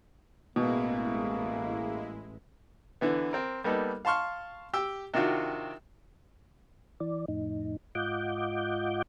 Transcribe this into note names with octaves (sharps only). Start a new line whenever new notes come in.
A1 B2 G#3 A#3 E4
D3 E3 B3
C4 A#4
G3 A#3 B3 D#4 A4
F5 A5 C6 C#6 F6
G4 G5 E6
C3 D#3 D4 F4 F#4
E3 D5
F2 A2 D#4
G#2 F4 D#5 F#5 D6 G6